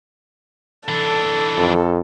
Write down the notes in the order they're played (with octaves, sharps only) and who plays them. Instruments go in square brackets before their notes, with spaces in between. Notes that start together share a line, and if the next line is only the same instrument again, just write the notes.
[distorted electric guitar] E3 D4 [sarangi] A4
[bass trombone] F2